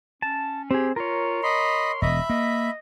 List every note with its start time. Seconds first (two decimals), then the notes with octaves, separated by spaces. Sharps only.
0.22 C#4 A5
0.71 C4 G4 G#4
0.96 F4 A#4 C#5
1.44 D#5 B5 C6
2.02 E1 D#5 E5 B5
2.30 A#3 D#5